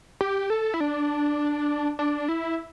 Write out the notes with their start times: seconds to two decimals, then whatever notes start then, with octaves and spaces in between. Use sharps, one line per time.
0.21 G4
0.50 A4
0.74 E4
0.80 D4
1.99 D4
2.29 E4